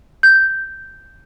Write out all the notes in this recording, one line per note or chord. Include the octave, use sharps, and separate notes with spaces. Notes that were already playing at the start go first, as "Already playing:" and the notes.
G6